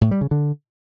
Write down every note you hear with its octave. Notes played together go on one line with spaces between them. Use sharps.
A2
G3
C#3
D3